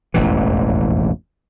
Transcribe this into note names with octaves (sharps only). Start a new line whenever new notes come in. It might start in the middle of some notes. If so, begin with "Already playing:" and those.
E1 A1 F2 E3